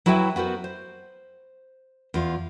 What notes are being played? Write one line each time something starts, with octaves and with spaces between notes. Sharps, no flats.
F#3 E4 F#4 B4 E5 G5
B3 F#4 A#4 C5
C5
E2 F4